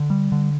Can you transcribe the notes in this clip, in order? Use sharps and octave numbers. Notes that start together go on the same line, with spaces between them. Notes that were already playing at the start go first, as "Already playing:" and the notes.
Already playing: D3
G3
D3